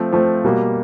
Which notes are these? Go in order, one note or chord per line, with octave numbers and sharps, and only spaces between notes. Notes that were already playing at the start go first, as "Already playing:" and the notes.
Already playing: F3 A3 C4
F3 A3 C4
B2 G3 A#3